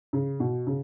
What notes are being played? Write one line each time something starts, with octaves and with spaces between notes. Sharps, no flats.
C#3
B2
C#3